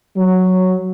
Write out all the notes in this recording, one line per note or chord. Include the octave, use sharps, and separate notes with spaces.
F#3